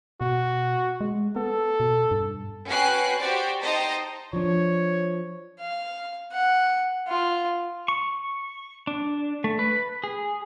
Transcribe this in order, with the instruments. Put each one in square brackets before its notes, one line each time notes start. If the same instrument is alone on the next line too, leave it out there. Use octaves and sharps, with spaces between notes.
[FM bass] B2 [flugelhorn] F#4
[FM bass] G#3
[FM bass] B3 [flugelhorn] A4
[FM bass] B2
G2
[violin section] C#4 F#4 B4 G5 F#6 C7
F#4 G4 C5 D5
D#4 C5 D#5 G5 A5 A#5
[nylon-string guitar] F3 D4 [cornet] C#5
[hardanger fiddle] F5
F#5
F4
[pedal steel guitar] C#6
D4
A3
B4
G#4